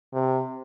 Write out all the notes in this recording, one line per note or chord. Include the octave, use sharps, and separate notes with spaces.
C3